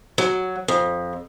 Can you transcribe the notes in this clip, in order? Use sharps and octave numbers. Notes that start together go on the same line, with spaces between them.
F#3
F2